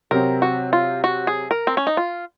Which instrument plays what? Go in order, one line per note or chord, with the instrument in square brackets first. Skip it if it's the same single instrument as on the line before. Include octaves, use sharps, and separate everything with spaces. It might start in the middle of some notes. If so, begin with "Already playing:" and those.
[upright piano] C3 F#3 C4 [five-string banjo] A#4
[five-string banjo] F#4
F4
F#4
G#4
A#4
C4
C#4
D#4
F4